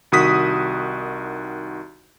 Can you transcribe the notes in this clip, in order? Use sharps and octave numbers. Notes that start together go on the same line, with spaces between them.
C2 D#3 F#4 D#6 B6